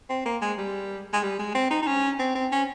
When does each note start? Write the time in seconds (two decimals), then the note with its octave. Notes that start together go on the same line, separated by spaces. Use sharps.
0.10 C4
0.26 A#3
0.42 G#3
0.58 G3
1.13 G#3
1.23 G3
1.39 G#3
1.55 C4
1.71 D#4
1.82 D#4
1.87 C#4
2.19 C4
2.35 C4
2.52 C#4